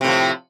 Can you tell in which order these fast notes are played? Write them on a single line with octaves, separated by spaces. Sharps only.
C3 A2 F3